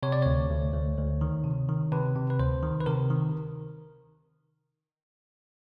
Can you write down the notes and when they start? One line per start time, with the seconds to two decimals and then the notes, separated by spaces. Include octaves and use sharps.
0.03 C3 C#5
0.12 D5
0.22 D2 C#5
0.50 D2
0.74 D2
0.98 D2
1.21 D#3
1.44 C3
1.69 D#3
1.92 C3 B4
2.16 C3
2.30 B4
2.39 D2 C5
2.63 D#3
2.80 B4
2.86 C3 A#4
3.10 D#3